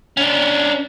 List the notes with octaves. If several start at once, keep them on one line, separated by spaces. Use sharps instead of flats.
C#4 D4